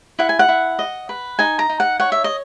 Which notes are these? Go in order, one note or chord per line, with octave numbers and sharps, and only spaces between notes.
E4 F#5
G#5
F#5
E4
D#5
B4
D#4 G#5
A#5
D#4
F#5
C#5 F#5
E5
D#5